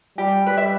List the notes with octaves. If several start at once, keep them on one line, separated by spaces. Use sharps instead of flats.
G3 G4
G3 B4
E5